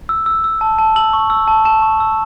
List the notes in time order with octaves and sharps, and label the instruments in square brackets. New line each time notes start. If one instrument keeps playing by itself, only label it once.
[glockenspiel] E6
E6
E6
A5
A5
E6 F#7
C#6
E6
A5
A5 E7
C#6
E6